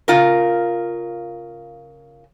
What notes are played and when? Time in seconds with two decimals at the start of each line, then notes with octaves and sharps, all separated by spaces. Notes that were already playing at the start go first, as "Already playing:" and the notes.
0.08 C#3 F4 A#4